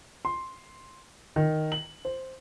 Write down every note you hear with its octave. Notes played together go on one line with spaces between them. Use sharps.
C6
D#3
F#7
C5